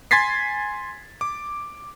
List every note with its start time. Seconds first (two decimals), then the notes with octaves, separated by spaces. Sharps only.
0.11 G#5 C6 G#6 A6 B6 C7
1.21 D6